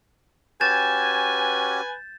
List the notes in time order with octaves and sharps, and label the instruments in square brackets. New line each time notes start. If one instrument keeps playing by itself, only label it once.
[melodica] C#4 F#4 G4 [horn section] B4 G#5 [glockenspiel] G6 A6 E7